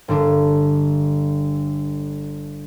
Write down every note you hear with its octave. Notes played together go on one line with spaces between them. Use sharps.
G1 D3 D4